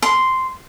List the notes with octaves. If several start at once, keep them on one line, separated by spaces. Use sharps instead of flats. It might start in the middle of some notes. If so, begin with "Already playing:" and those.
C6